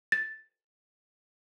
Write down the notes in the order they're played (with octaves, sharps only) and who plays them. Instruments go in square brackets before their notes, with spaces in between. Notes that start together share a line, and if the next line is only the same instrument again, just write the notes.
[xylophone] A6